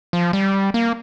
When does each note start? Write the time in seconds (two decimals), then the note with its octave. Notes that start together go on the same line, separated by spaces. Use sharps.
0.13 F3
0.33 G3
0.74 A#3